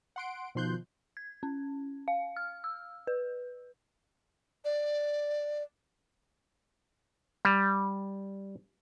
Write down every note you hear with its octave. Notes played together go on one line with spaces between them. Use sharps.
F#5 C6 D7
B2 D#3 F3 C6 F#6 G6
G#6
C#4
F5
F6
E6
B4
D5
G3